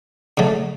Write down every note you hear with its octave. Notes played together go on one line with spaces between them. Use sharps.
C#3 F#3 A3